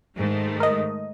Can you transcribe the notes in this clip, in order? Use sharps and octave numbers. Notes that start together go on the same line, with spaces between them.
G#2 D#3 A3
A#4 D#5